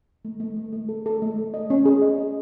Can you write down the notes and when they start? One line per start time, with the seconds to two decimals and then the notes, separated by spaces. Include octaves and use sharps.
0.25 A3
0.40 A3
0.56 A3
0.73 A3
0.89 A4
1.06 A4
1.22 A3
1.37 A3
1.54 D#5
1.70 C#4
1.86 G#4
2.02 D#5
2.18 D#5